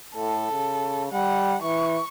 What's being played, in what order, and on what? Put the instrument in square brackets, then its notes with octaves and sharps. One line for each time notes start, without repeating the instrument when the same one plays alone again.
[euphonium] A2 [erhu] A4
[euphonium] C#3
[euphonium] G3 [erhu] F#5
[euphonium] E3 [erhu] C#6